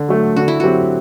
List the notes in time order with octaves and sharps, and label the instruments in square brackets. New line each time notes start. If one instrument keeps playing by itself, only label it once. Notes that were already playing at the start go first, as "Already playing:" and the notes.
Already playing: [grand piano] D3
F#3 A3
[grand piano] D3 [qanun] F#4
[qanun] E4
[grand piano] F#3 C4 G4 [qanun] F#4